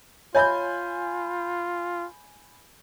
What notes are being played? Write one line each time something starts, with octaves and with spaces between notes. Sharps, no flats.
F4 C#5 D#5 E5 G#5 B5 G6